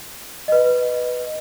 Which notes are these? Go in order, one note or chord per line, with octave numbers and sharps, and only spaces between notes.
B4 D#5